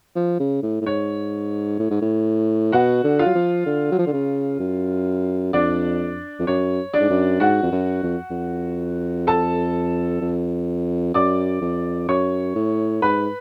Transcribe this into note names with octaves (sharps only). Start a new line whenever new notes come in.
F3
C#3
A2
A2
G#2 C#5
A2
G#2
A2
B2 F#4 F#5
D3
F4 F5
F#3
F3
D3
F#3
F3
D3
C#3
F#2
F2 D4 D5
F2
F#2 C#5
D4 D5
G#2
F#2
G#2 F#4 F#5
F2
F#2
F2
F2
A4 A5
F2
F#2 D5 D6
F2
F#2 C#5 C#6
A2
G#2 B4 B5